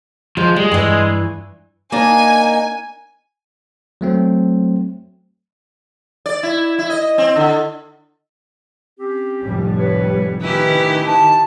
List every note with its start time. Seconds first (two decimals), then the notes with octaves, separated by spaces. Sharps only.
0.37 F3 G#3
0.56 G3 G#3
0.72 G2 E3
1.92 A#3 D4 D#4 G#5
4.01 F#3 A3 C4
6.26 D5
6.43 E4
6.79 E4
6.90 D#5
7.18 C4
7.36 D3
8.99 C4 C#4 G4
9.43 F1 A2 G3
9.78 B4 C#5
10.41 D#3 A3 C#4 E4 G4 B4
11.07 A5